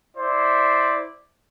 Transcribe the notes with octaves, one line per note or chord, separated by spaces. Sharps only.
E4 C5 D5